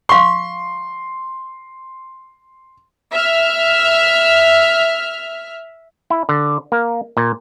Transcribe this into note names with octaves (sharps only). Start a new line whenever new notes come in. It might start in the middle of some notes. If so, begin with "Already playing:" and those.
F5 C6 C#6
E5 F6
E4
D3
A#3
A#2